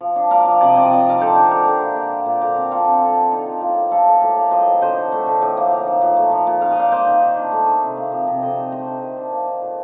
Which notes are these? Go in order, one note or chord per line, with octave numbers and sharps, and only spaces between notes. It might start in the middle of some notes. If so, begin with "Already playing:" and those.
F3
D4
A#3 A#4 D5
F3
C3 D5
D#5
C4 D5
D#5
F3 D5
D#5
D#4 A#4 D5
D3 A4 C5
D4
A3 G4 A#4
D3
A#2
A#3
G3
A#2
D3 A#4 D5
C4
G3 F4 A4
D3
F3 F4 A4
D4
A#3 D#4
F3
A2 F4
A#3
G3 F4 A4
A2
A2 G4 A#4
A#3
F3 C5 D#5
A2
D3 C5 D#5
D4
A3
D3
A2
A#3
F3
D#4
A#2
A3
F3
A#2
D#3 F5
D#5
D#4 D5 F5
A#3 C5 D#5
D#3
D#3
D4
A3
D#3
C3
A#3
F3
C3
D3 C5 D#5
D#4
A3 C5 D#5
D3
D#3
D4
A#3
D#3
A#2